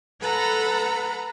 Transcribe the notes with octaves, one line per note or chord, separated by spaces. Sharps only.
A4 B4 F#5 A#5 B5